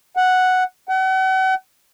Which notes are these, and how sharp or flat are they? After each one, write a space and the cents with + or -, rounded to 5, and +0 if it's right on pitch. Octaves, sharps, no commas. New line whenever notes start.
F#5 +0
F#5 +40